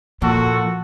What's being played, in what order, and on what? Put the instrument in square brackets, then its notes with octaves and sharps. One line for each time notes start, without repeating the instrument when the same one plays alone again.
[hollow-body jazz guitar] A#2 [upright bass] F3 [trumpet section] F#4 A4